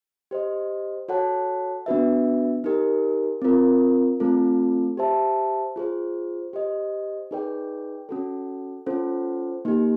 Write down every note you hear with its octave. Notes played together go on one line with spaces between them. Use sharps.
G4 C5 D#5
F#4 A4 C#5 F#5 A5
B3 D4 F#4 B4 E5
D#4 G4 A#4
C4 F4 A#4
A3 C4 F4 A4
G4 C5 E5 A5
F4 G#4 C5
G4 C5 D#5
D#4 G#4 B4 D5 G5
C#4 F#4 A4
C#4 F4 A4 C5
A#3 D#4 G4